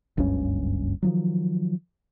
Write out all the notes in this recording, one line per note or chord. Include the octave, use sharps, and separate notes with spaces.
F#1 C#2 G2 C#4
D#3 F3 F#3